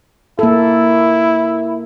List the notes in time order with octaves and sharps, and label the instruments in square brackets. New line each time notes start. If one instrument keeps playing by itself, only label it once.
[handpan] A#3 A4 [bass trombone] E4